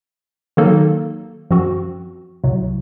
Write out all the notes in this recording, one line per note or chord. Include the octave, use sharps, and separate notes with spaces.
D#3 F#3 A#3 D#4 A4
F#2 F3 C4 F#4
C2 C3 F#3